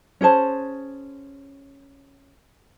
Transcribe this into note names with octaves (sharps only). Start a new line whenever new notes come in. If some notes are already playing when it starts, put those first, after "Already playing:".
C#4 G#4 C5 A5